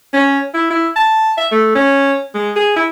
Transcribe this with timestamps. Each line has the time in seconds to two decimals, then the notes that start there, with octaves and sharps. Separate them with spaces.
0.13 C#4
0.54 E4
0.70 E4
0.96 A5
1.37 E5
1.52 A3
1.75 C#4
2.35 G#3
2.56 G#4
2.76 E4